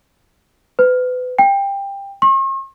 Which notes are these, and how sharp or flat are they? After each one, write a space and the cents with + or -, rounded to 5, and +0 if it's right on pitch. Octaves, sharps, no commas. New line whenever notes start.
B4 +30
G5 +20
C#6 -45